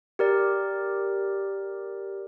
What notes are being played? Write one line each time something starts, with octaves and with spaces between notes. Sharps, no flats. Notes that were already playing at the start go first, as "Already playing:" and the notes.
G4 A#4 D5